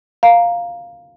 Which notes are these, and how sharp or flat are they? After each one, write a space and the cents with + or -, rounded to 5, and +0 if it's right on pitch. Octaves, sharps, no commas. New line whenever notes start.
F5 +0 A#5 +0